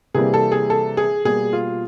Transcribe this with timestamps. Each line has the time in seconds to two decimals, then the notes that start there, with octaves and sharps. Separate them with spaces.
0.14 C3 E3 G3 A#3 G#4
0.34 A4
0.52 G#4
0.70 A4
0.97 G#4
1.25 B2 G3 A#3 G#4
1.53 F4